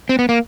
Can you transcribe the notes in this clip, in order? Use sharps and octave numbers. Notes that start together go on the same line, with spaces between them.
C4
B3
A#3